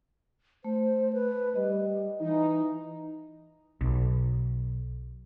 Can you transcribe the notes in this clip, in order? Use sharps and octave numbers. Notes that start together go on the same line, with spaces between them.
A3 C5
B4
G3 D#5
E3 D#4
B1